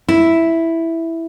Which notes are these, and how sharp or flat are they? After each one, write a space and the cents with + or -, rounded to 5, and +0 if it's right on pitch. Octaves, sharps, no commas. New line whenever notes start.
E4 +0